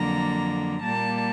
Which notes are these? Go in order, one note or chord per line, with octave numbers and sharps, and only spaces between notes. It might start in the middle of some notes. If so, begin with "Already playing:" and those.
Already playing: F2 D3 F#3 A#3 A#5
A#2 G3 A#3 A5